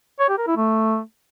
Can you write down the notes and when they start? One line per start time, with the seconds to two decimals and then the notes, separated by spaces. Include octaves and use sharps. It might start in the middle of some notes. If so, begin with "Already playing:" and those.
0.20 C#5
0.29 G4
0.38 A#4
0.48 E4
0.57 A3